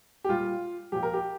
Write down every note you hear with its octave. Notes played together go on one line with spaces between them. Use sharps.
G4
A#2 G3 F4
A#2 F3 G4
A#4
G4